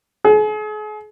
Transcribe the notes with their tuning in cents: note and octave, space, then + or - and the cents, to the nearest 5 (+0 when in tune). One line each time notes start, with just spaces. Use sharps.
G#4 +40